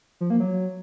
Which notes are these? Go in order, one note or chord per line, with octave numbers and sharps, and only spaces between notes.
F3
A#3
F#3